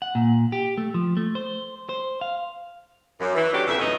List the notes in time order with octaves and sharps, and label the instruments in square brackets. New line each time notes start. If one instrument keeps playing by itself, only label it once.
[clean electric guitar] F#5
A#2
G4
A3
F3
A3
C5
C5
F5
[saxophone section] F#2
E3
F#3 A3 C#4 D4 F#4 G4
F2 C#3 E3 A3 E5
F#2 B2 E3 A3 B3 D#4